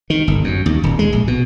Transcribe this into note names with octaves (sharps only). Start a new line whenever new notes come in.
D#3
G1
F#2
D#2
D#1
G#3
A#1
B2